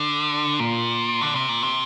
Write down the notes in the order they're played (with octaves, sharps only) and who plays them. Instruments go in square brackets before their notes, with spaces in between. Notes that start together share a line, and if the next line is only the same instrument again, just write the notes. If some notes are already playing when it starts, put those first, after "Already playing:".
Already playing: [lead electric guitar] D3
A#2
D3
C3
A#2
C3